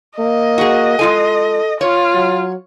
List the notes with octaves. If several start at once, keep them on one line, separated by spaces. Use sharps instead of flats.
A#3 D#5
F#4 G#4
G#3 F4 A4 G#5
F4 C#5
F#3